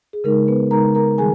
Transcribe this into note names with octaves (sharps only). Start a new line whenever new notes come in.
G#4
C#3 G#3 D#4 A#4
B3 B4
C#3 G#3 D#4 A#4 A#5
A#4 A#5
D#3 G3 G#4 G#5